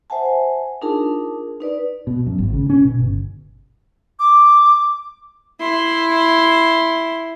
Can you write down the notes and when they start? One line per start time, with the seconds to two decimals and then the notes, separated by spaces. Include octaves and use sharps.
0.10 C5 E5 F#5 G#5 A5
0.81 D4 D#4 F4 G#4 A#4 A5
1.60 D#4 B4 D5
2.07 B2
2.26 F#2
2.38 G#1
2.53 C#3
2.70 C#4
2.85 B2
2.99 G1
4.20 D6
5.60 E4 C6